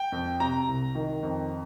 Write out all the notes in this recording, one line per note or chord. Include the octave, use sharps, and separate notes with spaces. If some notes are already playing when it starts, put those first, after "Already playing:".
Already playing: G5
F2
C3 A#5
C2
D#3
F2